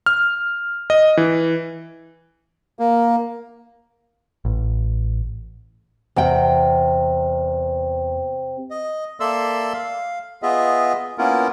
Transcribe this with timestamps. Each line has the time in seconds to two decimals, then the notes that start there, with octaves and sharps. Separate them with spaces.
0.06 F6
0.90 D#5
1.17 E3
2.79 A#3
4.45 A1
6.16 E2 C3 F#5 G5
8.70 D#5
9.20 A#3 A4 D5 E5 C6 E6
9.73 F5
10.42 B3 F4 G#4 D#5 E5
11.18 A#3 B3 C#4 E4 F4 A#4